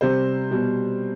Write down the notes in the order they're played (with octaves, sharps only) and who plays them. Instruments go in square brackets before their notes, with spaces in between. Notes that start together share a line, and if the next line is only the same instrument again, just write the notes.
[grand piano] C3 G3 C5
B2 G3